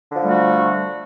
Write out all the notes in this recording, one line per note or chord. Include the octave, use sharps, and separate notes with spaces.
D3 F3 G3 A3 F#4